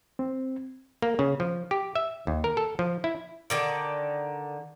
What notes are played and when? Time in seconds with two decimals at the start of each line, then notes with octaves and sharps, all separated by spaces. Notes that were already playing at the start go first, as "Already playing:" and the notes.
0.19 C4
1.02 A#3
1.19 C#3
1.40 F3
1.71 G4
1.96 E5
2.27 D#2
2.44 A#4
2.57 A4
2.79 F3
3.04 E4
3.50 D3 D#3 D5